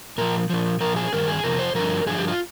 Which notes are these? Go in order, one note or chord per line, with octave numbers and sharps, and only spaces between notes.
A#2 F3 A#4
A#2 F3
A#2 F3 A#4
G#4
G2 D#3 A#4
G#4
F2 C3 F3 A#4
C5
G2 D3 F3 A#4
G2 D3 F3 G#4
G4
F4